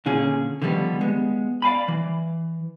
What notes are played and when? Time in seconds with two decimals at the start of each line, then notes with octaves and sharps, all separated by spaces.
0.06 A#2 D3 C#4 F4 G#4
0.62 D3 D#3 F3 G3 B3
1.01 G#3 B3
1.62 D5 F5 G#5 B5
1.88 E3